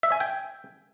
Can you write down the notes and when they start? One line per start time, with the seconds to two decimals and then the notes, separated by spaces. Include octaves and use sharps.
0.03 E5
0.12 G#5
0.20 G5